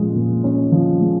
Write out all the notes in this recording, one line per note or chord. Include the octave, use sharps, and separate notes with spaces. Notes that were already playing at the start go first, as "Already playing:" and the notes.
Already playing: A#2 F3 G#3 C#4
A#2
C#4
F3
G#3